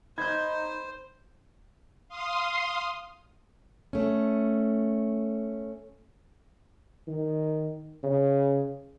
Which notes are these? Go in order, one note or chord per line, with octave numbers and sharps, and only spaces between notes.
D#4 C5 B5 G6 G#6
F5 C6 D#6
A3 C#4
D#3
C#3